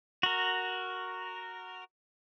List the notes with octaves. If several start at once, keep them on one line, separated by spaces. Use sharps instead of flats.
F#4 A#4